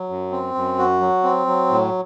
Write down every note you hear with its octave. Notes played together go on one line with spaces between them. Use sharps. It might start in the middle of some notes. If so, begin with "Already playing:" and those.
Already playing: F#3
F#2
C4
F#2
F#4
F#3
C4
F#3
A2